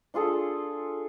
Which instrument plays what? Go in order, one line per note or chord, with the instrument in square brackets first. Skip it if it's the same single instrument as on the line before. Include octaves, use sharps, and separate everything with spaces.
[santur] D4 F4 G#4 A4